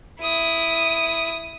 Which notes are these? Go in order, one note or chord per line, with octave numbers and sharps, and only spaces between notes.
E4 D#6